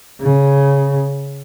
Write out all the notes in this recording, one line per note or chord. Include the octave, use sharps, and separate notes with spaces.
C#3